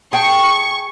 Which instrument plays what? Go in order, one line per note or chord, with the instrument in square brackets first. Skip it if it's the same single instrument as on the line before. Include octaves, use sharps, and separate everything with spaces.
[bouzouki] G#4 G5 A5 [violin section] C#6